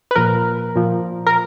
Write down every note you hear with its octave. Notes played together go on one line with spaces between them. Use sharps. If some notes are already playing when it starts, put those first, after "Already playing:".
B4
A#2 F3 A#4
A#2 F3
A#4